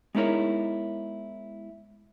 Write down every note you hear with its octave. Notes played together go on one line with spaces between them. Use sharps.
G#3 B3 D#4 E4 A#4 C#5